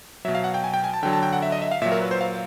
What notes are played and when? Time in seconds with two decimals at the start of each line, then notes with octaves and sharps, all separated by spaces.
0.25 F#3 E5
0.28 B2
0.35 F5
0.44 F#5
0.54 G5
0.64 G#5
0.74 G5
0.84 G#5
0.94 A5
1.03 D3 F#3 G5
1.13 A5
1.23 G5
1.33 F#5
1.42 E5
1.52 D#5
1.62 E5
1.71 F5
1.82 A#2 E5
1.85 F#3
1.92 A#4
2.01 B4
2.11 C5
2.21 F5